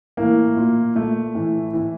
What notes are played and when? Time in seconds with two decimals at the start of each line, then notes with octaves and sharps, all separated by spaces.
0.17 A2 E3 A#3
0.57 A#2
0.95 A#2 A3
1.35 A2 E3
1.73 A2 E3